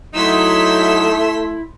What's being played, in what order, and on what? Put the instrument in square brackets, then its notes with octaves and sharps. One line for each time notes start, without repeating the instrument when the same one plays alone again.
[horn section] F#3 D#4 [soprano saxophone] A3 [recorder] E4 [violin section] C6 E6 B6